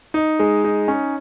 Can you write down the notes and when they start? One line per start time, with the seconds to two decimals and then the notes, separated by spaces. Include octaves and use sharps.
0.14 D#4
0.40 G#3
0.64 D#4
0.88 C#4